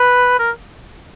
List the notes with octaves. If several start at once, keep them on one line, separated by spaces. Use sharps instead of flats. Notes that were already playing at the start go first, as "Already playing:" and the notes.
Already playing: B4
A#4